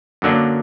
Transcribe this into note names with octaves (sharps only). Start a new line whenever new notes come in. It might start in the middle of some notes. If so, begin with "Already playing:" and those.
F#2 D3 F#3 A#3 D4